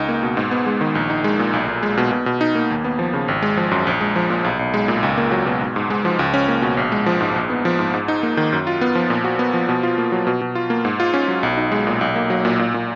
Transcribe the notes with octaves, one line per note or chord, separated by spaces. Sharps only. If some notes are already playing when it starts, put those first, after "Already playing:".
Already playing: C#2 D#4
A#3
B2
G#2
B3
G#3
D#3
A#1
D#4
G#3
A#2
B1
B1
G#3
B2
B2
B2
D#4
A#3
D#2
B3
F3
C#3
G#1
G#3
F3
F#2
A#1
G#3
F3
A#2
B1
B1
G#3
A#2
C#2
A#3
F#3
B2
G#2
G#2
G#3
F3
C#2
C#4
A#3
B2
A#1
G#3
F3
G#2
A#1
B3
F3
G#2
G#2
D#4
A#3
D#3
F#2
F4
B3
F3
A#2
F#4
B3
F3
B2
F4
A#3
F#3
B2
B2
F4
A#3
G#2
F4
C#4
F#3
B1
D#4
G#3
A#2
B1
A#3
F#3
A#2
A#2
A#2